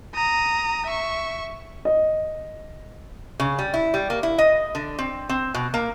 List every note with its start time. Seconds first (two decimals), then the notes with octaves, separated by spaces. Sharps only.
0.15 A#5 D#6
0.86 E5 C#6
1.85 D#5
3.40 C#3
3.59 G3
3.74 E4
3.94 G3
4.10 A#3
4.23 E4
4.38 D#5
4.75 D3
4.99 C4
5.29 C4
5.54 B2
5.74 A#3